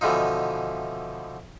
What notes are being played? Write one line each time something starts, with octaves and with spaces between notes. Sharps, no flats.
B2 D3 E3 F3 D#4